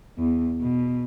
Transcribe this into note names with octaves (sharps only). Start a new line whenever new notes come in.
E2
B2